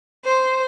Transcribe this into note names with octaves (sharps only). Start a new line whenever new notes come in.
C5